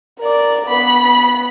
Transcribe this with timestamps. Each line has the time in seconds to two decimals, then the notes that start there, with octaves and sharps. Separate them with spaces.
0.19 A#4 D5
0.67 B3 B5